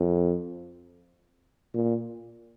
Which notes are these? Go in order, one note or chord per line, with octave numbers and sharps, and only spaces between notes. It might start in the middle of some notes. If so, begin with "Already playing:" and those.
Already playing: F2
A#2